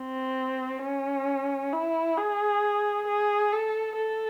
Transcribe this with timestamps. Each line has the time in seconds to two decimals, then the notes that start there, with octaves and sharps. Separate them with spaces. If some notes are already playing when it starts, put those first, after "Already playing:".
Already playing: C4
0.83 C#4
1.73 E4
2.17 G#4
3.07 G#4
3.52 A4
3.97 A4